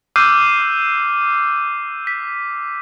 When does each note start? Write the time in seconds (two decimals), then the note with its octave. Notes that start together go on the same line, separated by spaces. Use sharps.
0.16 D6 E6 F6 G6 C7 D#7
2.07 B6